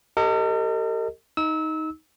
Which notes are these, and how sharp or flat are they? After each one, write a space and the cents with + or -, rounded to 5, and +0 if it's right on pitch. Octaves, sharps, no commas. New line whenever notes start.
G4 +0 A#4 -45 D#5 +0
D#4 +10 E6 -25